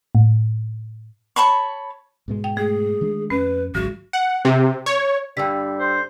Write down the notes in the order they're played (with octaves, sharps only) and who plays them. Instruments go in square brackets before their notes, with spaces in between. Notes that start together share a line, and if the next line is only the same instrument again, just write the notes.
[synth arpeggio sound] A2
[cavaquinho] C#5 A5 B5 C#6
[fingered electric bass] G#2 B2 G#3
[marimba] G5
[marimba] A3 [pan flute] G#4
[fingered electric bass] D#3 G#3 D4
[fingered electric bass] F2 [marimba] C#4 [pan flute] B4
[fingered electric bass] G#1 C#2 G#3 [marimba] F#3 [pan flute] F#4
[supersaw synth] F#5
C3
C#5
[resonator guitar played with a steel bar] G2 D3 [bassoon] G3 [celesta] G5 E6 B6
[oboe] C5